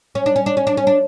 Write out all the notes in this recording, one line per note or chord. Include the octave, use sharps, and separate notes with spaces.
C#4
D4
C#4
D4
C#4
D4
C#4
D4